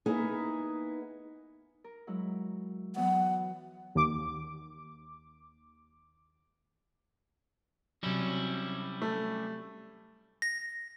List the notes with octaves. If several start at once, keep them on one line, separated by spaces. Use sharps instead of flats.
A#3 B3 D#4 E4 G#4
A#4
F#3 G#3 E4
E3 F#3 B3 F#5
D#2 D6
C3 F#3 G3 C#4 E4
A3
A#6